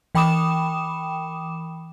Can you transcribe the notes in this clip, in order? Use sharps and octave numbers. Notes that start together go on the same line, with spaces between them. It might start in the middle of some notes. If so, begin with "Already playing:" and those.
E3 G5 B5 D6 D#6 E7